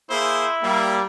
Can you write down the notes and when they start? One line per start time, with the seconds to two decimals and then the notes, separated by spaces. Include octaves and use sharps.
0.10 A#3 E4 G#4 C5
0.63 G3 A#3